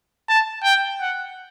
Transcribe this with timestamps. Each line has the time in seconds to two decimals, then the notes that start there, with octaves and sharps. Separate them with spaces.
0.29 A5
0.64 G5
1.01 F#5